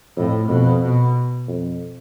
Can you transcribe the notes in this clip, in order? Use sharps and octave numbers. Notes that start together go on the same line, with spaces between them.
F2 A2
F2 B2
B2
F2